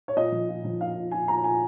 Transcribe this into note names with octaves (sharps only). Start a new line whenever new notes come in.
C#5
A#2 D#5
F3
A#2
F3
A#2 F5
A#2
A#2 G#5
A#2 A#5
A#2 G#5